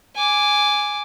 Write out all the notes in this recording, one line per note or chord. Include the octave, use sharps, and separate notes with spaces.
G#5 D6